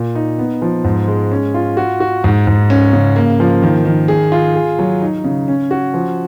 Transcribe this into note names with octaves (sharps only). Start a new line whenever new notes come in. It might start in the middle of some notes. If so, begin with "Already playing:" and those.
Already playing: A#2
D#4
B3
F3
G#2
G#3
C#4
F4
F#4
F#4
G#2
G#2
C#4
C#3
A#3
F3
D#3
D#3
G#4
F4
G#4
F#3
D#4
C#3
C#4
F#4
F3